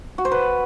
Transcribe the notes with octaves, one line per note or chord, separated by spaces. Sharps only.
F#4
C5
B4